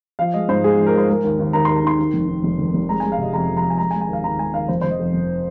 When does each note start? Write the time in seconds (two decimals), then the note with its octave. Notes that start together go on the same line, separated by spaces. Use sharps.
0.19 F3 F5
0.34 G#3 D#5
0.48 G#2 C5
0.63 G#3 G#4
0.79 F3
0.86 A#4
0.94 G#3 C5
1.08 G#3 A#4
1.24 D#2
1.39 D#2
1.53 D#2 A#5
1.65 D#2 C6
1.76 A#5
1.84 D#3 C6
1.99 D#3
2.14 F1
2.28 D#3
2.44 F1
2.59 F1
2.74 F1
2.89 G#3 A#5
3.00 G#3 G#5
3.12 F5
3.18 C3 D#5
3.33 F2 A#5
3.49 F2
3.57 A#5
3.64 F2
3.70 G#5
3.78 G#3 A#5
3.91 G#5
3.94 G#3
4.01 G#5
4.09 D#2 F5
4.24 D#2 A#5
4.38 G#3 G#5
4.53 D#2 F5
4.68 F1 C5
4.81 F1 C5
4.91 D#5
4.99 F2
5.14 F1